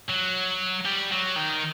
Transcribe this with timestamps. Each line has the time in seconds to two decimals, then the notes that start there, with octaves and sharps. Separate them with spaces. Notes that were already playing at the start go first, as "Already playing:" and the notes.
0.10 F#3
0.85 G3
1.12 F#3
1.36 D#3